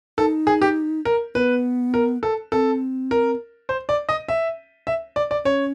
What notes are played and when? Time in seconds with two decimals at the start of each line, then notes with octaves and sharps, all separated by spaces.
0.18 D#4 A4
0.47 G#4
0.62 G4
1.05 A#4
1.35 B3 B4
1.94 A#4
2.23 A4
2.52 C4 A4
3.11 A#4
3.69 C5
3.89 D5
4.09 D#5
4.28 E5
4.87 E5
5.16 D5
5.31 D5
5.45 C#4 C#5